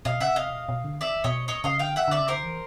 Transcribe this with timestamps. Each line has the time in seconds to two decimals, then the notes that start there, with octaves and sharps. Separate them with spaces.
0.05 B2 D#5 F5
0.20 C#3 E5 F#5
0.28 C3
0.36 D#5 F5
0.52 B2
0.69 B2
0.84 D3
1.00 D#3 D5 E5
1.24 B2 C#5 D#5
1.48 C#5 D#5
1.64 C#3 D#5 F5
1.79 D3 F5 G5
1.96 D#3 E5 F#5
2.08 D3 D5 E5
2.20 C#3
2.28 D3 A#4 C5
2.43 E3